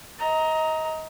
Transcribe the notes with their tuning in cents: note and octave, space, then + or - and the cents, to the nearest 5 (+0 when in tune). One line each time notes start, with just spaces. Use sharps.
D#5 +30 A#5 +0